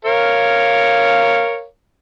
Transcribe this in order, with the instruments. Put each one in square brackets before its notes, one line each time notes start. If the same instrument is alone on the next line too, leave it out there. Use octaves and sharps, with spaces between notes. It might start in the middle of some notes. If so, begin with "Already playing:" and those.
[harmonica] A#4 C#5 F5